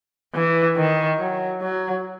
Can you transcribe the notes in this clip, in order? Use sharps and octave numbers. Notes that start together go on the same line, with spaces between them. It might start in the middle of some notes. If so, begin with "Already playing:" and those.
E3
D#3
F#3
F#3